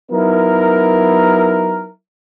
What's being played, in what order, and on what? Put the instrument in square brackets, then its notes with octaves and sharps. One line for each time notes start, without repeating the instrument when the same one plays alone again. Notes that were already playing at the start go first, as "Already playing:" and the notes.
[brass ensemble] F#3 B3 D#4 E4 A#4